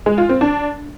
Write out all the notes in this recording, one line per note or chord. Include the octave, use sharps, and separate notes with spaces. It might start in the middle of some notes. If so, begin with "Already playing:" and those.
G#3
F4
C4
D4